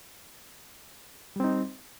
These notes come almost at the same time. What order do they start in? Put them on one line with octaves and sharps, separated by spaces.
G3 C4 D#4